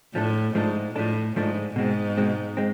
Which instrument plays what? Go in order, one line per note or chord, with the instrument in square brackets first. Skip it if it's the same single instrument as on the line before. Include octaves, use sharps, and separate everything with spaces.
[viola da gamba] A2 [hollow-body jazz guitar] F3 A3 D4 A4
[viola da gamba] G#2 [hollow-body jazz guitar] F3 A3 D4 A4
[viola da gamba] A2 [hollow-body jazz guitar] F3 A3 D4 A4
[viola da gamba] G#2 [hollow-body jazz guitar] F3 A3 D4 A4
[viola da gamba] G#2 [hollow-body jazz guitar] B2 G#3 C4
[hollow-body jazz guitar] B2 G#3 C4
G#3 C4